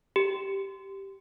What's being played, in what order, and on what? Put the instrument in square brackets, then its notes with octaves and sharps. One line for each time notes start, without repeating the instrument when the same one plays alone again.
[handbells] G4